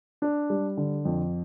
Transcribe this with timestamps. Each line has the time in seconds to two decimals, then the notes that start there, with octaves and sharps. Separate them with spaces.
0.22 D4
0.50 G3
0.77 D3
1.05 F2